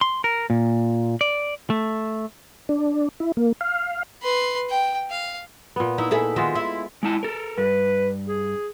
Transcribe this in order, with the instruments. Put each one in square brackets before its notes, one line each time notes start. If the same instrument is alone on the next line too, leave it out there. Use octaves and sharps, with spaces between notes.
[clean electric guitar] C6
A#4
A#2
D5
A3
[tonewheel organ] D4
E4
A#3
F5
[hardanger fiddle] B4 C6
G5
F5
[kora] A#2 B3
[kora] D#4 [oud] E4
[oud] E4 G#4 A4
[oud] D#3 F#4 [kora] G#3 F4 E5
[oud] E4
[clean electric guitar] G#3 E4 A5
A4 A#4
[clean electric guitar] G2 [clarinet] B4
[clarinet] G#4